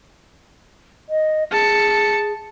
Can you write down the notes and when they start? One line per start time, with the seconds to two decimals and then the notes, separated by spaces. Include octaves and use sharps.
1.09 D#5
1.52 G#4 A5 C#7